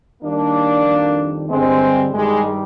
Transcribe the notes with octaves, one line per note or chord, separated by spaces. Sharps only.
D#2 D#3 G3 A#3 D4
F2 D#3 G3
G2 D3 G3 G#3 C4
G2 D#3 G3 G#3